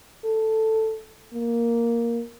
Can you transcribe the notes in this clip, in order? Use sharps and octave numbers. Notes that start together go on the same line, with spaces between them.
A4
A#3